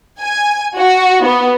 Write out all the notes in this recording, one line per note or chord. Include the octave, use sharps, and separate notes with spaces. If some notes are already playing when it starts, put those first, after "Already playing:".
G#5
F#4
B3